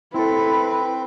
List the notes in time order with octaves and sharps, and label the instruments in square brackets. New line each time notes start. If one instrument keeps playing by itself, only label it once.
[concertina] C4 [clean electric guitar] E4 A4 [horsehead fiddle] B4